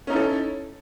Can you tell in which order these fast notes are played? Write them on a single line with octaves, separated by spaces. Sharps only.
C#4 D#4 E4 A4